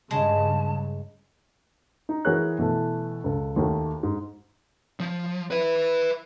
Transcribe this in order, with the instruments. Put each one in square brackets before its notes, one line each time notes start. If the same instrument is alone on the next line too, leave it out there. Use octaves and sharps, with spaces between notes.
[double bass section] G2 C#3 [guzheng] G#3 [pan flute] A5
[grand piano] D#4
E3 F#4 G#4 A#4 C#5 F#6
B2 E3 A3
C#2 A4
D#2 D#3 A3 F#4
G#2
[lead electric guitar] F3
B4 E5